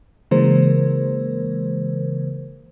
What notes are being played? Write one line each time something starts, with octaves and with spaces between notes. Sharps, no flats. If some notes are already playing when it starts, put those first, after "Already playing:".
C#3 E3 G#3 A#3 A#4 C5